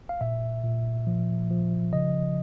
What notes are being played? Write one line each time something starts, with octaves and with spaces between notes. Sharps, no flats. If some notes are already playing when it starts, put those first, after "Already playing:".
F5
A#2 E5
A#2
F3
F3
C#3 D#5